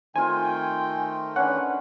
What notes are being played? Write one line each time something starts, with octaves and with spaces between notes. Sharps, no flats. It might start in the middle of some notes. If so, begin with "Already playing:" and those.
D#3 A3 C4 D#4 F4 G5 G#5
C#4 D4 B4 F#5